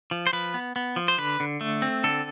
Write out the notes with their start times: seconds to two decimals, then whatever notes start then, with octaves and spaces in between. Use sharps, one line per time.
0.11 F3
0.27 C5
0.33 F3 B4
0.54 B3
0.76 B3
0.96 F3
1.08 C5
1.18 D3 B4
1.40 D3
1.61 A3
1.82 C4
2.04 D3 A4